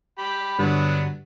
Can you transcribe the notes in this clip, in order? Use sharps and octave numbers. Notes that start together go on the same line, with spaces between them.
G4 B5
G2 D3 F#3 G3 B3 D4